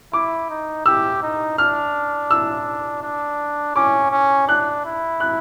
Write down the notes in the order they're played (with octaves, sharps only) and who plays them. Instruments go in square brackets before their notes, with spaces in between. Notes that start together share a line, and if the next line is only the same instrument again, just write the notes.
[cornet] E4 [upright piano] D6
[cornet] D#4
[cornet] G4 [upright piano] E6
[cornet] D#4
[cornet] D4 [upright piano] F6
[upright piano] E6
[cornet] D4
[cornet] C#4 [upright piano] D6
[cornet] C#4
[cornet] D4 [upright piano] F#6
[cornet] E4
[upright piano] F#6